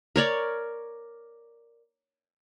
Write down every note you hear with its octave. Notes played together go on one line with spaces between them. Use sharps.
A#4 C#5 D5